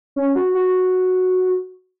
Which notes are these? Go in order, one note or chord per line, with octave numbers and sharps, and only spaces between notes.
C#4
F#4
F#4